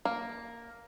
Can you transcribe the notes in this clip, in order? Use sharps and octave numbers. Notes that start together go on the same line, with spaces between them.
A#3